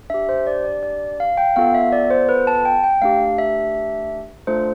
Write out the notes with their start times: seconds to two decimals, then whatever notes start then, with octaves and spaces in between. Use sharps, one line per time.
0.10 D4 G4 E5
0.29 C5
0.47 D5
0.65 D5
0.83 D5
1.20 F5
1.37 G5
1.56 B3 F4 A4 F5
1.75 E5
1.92 D5
2.10 C5
2.29 B4
2.47 A5
2.65 G5
2.84 G5
3.02 A3 D4 G4 F5
3.38 E5
4.47 A3 D4 F4 A4 C5